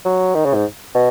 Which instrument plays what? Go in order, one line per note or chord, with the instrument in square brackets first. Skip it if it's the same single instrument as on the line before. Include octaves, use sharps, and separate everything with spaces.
[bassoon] F#3
D#3
C#3
G#2
B2